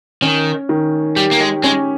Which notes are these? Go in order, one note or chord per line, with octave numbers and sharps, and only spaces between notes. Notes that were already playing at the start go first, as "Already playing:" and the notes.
D#3 C#4
D#3
G3 G4
A#3
G#3
G#3 C#4